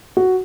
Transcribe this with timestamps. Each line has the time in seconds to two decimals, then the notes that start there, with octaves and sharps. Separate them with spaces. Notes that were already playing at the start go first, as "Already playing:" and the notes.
0.17 F#4